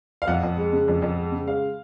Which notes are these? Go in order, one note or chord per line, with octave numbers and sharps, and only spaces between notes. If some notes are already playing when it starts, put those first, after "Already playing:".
F5
F2 F#5
F2
G#3
C#3
F2
F2
G#3
C#3
G#3 F5